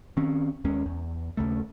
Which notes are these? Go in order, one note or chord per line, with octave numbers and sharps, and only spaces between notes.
D#3 C4 C#4
D#2 G#3 C#4
E2
D#2 C#3 A3